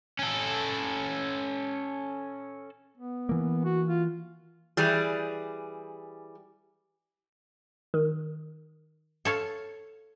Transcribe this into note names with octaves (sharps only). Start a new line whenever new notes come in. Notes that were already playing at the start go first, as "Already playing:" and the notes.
C#4 A4
B3
E3 A#3
F#4
F4
E3 G3 G#4
D#3
A4 C#5 F5